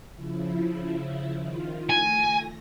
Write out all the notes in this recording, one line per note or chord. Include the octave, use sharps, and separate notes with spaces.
C#3 F3 E4
D#3 F4
A3 G#5 A#6